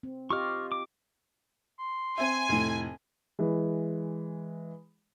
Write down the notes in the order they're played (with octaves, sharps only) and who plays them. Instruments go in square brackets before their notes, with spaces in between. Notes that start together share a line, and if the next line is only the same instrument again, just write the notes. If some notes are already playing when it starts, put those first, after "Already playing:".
[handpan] C4
[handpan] F4 G4 D#5 [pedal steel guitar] C#6 D6 F6
[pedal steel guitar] D6
[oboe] C6
[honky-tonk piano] C4 E5 [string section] G#5
[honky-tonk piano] F1 A2
[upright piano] E3 G#3